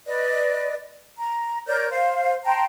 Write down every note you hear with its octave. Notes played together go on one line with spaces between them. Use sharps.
B4 D5 D#5
A#5
A#4 C#5 D5 G6
C5 F5
G5 A5 A#5 C6